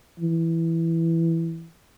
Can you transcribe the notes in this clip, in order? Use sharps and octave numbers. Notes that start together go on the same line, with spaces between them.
E3